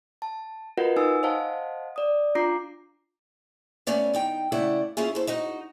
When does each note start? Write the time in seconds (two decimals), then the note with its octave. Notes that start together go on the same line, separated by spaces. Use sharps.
0.22 A5
0.77 F4 F#4 A#4 B4 D#5 F#5
0.96 D#4 G#5 D#6 E6
1.23 C5 D#5 F5 F#5 A5
1.96 D5 D#6
2.35 D4 F4 A#5 D6 C7
3.87 A3 B3 C#4 D5 F5
4.14 D#3 D#4 G5
4.52 C#3 A3 E4 A4 D5 F#5
4.97 C#4 E4 F4 G#4
5.15 A4 C5
5.27 D#4 F#4 D#5